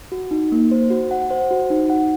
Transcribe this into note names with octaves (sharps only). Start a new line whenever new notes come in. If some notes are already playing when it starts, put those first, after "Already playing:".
F#4
D#4
A#3
C5
F#4
F#5
C5
F#4
D#4
F#5